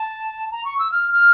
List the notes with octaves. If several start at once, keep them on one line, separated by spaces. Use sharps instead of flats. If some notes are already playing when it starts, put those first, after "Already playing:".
Already playing: A5
A#5
C#6
E6
F6
F6